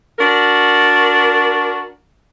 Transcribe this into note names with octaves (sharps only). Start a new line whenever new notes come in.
D4 F#4 A#4